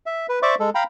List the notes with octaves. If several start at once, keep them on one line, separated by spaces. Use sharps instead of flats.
E5
B4
C5 D5 E5 C#6 D6
G#3 A4
F5 G5 A#5 B5